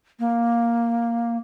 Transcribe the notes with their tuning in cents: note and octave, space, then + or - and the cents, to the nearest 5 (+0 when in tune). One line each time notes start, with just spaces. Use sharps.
A#3 +5